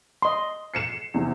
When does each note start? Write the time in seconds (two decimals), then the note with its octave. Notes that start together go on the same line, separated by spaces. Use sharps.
0.22 D#5 C6
0.74 C7 C#7 E7
1.14 E2 C3